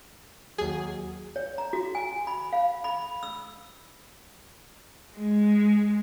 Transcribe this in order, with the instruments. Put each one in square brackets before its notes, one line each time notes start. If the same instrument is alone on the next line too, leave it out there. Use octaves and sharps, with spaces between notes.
[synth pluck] D#2 G#4 [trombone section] F#3 F#4
[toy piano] C#5
A#5
F#4
G#5
B5
F5
B5
E6
[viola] G#3